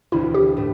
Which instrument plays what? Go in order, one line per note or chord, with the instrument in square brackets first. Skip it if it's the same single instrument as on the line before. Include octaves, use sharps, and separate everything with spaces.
[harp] E1 D2 D3 [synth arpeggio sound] E4
[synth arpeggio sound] G4
[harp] A2 A3